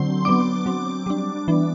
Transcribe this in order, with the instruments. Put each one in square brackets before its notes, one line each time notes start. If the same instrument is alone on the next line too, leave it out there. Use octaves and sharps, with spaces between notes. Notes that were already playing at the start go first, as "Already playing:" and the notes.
Already playing: [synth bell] D3 F#3 C4 C6
F#3 B3 D4 D6
F#3 C4
G3 D4
E3 B3 D4